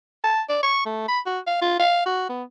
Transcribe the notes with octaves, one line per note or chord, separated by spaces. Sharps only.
A5
D5
C#6
A3
B5
F#4
F5
F4
F5
F#4
B3